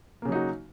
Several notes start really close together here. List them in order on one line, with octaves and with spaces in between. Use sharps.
A#3 C#3 F#3 D#4 F#4